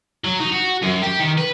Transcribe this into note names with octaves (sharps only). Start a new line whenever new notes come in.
F#3
D#4
F#4
F#2
G4
D#3
B4